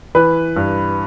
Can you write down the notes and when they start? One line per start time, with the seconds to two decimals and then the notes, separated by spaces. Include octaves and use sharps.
0.15 E3 B4
0.56 G2